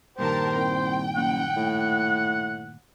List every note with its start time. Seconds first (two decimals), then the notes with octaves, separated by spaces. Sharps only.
0.18 G2 A#2 D#3 G4 A#4 C5 A5
0.55 C2 G5
1.16 F#1 F#5
1.56 A2